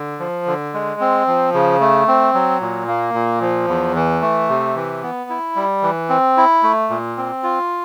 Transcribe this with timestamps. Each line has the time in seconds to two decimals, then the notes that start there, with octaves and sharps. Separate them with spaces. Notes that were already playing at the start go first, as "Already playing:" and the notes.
Already playing: D3
0.20 F3
0.46 D3
0.74 G#3
1.00 C4
1.27 F3
1.54 C#3
1.81 A3
2.08 C4
2.34 F#3
2.61 A#2
2.87 A#3
3.14 A#2
3.41 F3
3.68 E2
3.95 E3
4.21 A3
4.49 C3
4.75 E3
5.03 B3
5.30 E4
5.56 G3
5.83 E3
6.09 C4
6.37 E4
6.63 A3
6.90 A#2
7.17 C4
7.43 F4